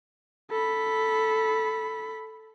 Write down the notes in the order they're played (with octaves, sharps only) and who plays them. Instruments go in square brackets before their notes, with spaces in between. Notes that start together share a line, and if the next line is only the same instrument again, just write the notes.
[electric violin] A4 B5